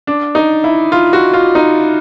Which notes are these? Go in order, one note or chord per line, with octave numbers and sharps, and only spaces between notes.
D4
D#4
E4
F4
F#4
F4
D#4